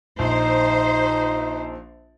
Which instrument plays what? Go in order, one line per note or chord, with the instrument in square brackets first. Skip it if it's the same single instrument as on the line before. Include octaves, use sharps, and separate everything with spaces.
[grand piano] A#1 [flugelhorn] D#4 [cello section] C5